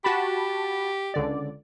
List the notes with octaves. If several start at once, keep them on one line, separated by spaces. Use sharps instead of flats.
F#4 G4 A5 B5
C#2 D3 D5